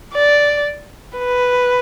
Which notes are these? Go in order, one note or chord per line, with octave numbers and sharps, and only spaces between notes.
D5
B4